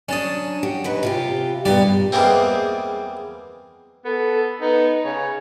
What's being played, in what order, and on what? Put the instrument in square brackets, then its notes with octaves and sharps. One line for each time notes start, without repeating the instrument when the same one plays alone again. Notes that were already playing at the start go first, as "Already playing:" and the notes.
[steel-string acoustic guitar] F#3 D4 [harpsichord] C#4 A5 D#6
[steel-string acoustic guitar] F#4 G4
D#2 F#3 B4
C3 F4 G4
[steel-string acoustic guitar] G2 A#2 B3 [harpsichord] G3 G4 D5
[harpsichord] E2 G3 G#3 A#3 C4
[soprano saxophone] B3 [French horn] A4
[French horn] B3 [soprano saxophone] D#4
[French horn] C#3 [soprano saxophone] C#5